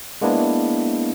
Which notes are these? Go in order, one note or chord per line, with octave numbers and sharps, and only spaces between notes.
G#3 A#3 B3 D4 E4